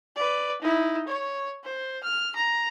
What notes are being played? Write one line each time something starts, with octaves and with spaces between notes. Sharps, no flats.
B4 D5
D#4 E4
C#5
C5
F6
A#5